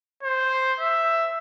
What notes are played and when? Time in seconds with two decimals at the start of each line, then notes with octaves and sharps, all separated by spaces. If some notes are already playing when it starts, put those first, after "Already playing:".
0.23 C5
0.80 E5